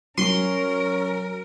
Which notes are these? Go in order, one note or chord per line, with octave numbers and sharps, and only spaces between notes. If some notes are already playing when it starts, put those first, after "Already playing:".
F#3 C#4 A#4 C6